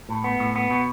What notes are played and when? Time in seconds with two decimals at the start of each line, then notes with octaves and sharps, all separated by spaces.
0.09 A2
0.24 B3
0.40 A2
0.56 B3
0.70 B2